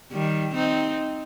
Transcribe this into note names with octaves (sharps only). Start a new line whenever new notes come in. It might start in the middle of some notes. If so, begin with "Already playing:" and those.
D#3 G3
C4 D#4